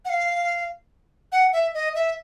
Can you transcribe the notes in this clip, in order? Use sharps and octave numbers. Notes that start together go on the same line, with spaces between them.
F#5
F5
F#5
E5
D#5
E5